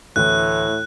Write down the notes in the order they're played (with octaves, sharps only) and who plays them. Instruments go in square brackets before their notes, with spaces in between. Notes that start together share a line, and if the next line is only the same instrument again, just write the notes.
[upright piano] D2 E3 [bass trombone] A2 [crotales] F#6